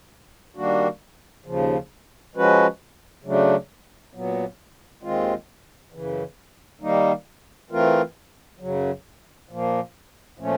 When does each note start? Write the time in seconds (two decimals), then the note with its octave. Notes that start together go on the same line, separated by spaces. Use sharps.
0.56 D#3 G3 A#3 D4 F#4
1.46 D#2 C#3 F3
2.35 F3 G#3 C#4 F#4 B4
3.24 C#3 F#3 A3 D4
4.13 A#2 F#3 B3
5.03 D#2 D#3 G#3 C4 F4
5.92 F#2 C#3 E3
6.81 D#3 G3 A#3 D#4
7.71 E3 A3 C4 F4 A#4
8.60 F#2 C#3 F#3
9.49 A#2 F3 A#3
10.38 A#2 F3 A3 C#4